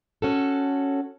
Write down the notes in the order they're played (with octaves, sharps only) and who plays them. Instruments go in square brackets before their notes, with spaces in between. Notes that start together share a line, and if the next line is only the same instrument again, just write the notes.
[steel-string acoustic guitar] C#4 F#4 A4